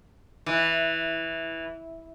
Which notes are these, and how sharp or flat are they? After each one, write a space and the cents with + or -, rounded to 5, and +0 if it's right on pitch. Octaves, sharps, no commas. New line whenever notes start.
E3 -10